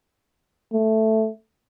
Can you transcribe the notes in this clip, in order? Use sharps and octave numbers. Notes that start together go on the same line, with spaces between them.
A3